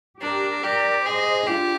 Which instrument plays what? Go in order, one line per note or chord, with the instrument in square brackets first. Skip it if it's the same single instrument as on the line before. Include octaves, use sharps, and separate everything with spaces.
[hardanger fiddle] D4 [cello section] G4 A#4
[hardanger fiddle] G4 [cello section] A#4 D5
[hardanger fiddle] G#4 [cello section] C5 D#5
[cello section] D4 F4 [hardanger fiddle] G4